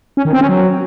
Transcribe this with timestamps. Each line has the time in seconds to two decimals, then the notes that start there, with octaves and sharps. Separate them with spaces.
0.17 C#4
0.25 D#3
0.33 C4
0.41 C#4
0.49 F#3